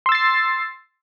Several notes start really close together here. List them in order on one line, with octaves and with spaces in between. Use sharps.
C6 E6 A6 C7